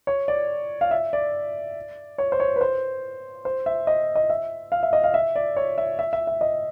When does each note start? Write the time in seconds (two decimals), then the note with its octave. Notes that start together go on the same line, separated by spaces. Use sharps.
0.07 C#5
0.28 D5
0.81 F5
0.91 E5
1.13 D5
2.18 C#5
2.32 C5
2.40 C#5
2.56 B4
2.61 C5
3.45 C5
3.66 E5
3.87 D#5
4.15 D#5
4.30 E5
4.72 F5
4.83 E5
4.93 D#5
5.04 F5
5.14 E5
5.36 D5
5.56 C#5
5.78 E5
5.99 E5
6.13 E5
6.27 E5
6.41 D#5